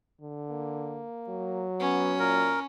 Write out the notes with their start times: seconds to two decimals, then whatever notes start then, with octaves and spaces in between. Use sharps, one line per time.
0.21 D3
0.50 A#3
1.29 F#3
1.80 B3 C#4
2.19 A#2 A#4